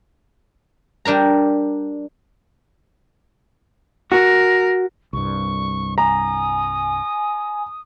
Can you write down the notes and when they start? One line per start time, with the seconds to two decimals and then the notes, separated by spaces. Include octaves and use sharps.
1.05 G3 D4 A#4 A#5
4.12 F#4 A#4
5.13 C2 G2 C#6
5.98 G#5 A#5 D#6